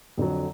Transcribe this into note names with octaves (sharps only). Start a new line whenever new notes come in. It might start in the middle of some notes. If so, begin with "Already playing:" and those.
F2 D3 F#3